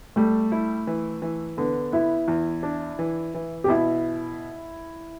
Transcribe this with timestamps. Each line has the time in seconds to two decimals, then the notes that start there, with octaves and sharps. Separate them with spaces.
0.16 G3 A3
0.52 E4
0.87 E3
1.22 E3
1.57 D3 B3
1.92 B3 E4
2.28 E2
2.63 D4
2.99 E3
3.34 E3
3.64 G4
3.68 B2 E4